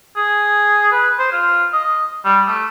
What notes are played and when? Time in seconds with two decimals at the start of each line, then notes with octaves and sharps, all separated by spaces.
0.17 G#4
0.92 B4
1.19 C5
1.32 F4
1.73 D#5
2.25 G3
2.47 A3